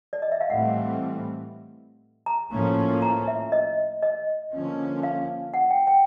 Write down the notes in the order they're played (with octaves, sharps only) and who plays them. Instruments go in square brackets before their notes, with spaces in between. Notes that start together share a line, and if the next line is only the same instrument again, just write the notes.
[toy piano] D5
D#5
E5
F5
[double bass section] A2 E3 G3 C4 [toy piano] F#5
[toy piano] A#5
[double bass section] A2 F3 A#3 C#4
[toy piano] A#5
E5
D#5
D#5
[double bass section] D3 F3 A#3 C#4
[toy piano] F5
F#5
G5
G5